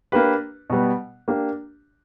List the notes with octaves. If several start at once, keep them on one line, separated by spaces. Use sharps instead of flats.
A#3 D4 G4 B4
B2 G3 B3
A#3 D4 G4